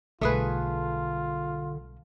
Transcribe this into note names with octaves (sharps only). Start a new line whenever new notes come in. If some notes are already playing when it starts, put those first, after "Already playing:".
B1 D3 G3 A3 F4 G#4 B4